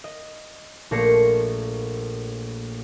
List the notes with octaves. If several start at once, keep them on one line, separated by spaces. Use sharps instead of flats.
D#5
A#1 A3 A#3 A#6 C7 C#7